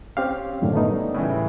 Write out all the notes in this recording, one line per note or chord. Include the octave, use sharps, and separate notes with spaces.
C4 C#4 G4 F5
F#2 A2 D3 D#3
A3 B3 D#4
G3
A2 C#3 E3